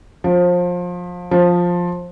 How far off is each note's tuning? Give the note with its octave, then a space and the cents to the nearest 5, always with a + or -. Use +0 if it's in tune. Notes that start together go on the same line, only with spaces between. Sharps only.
F3 +25
F3 +10